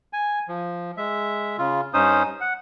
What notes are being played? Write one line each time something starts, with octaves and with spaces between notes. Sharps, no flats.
G#5
F3
G#3 E5
C#3 F4
G2 C#4 D#4 C5 D#6
F#5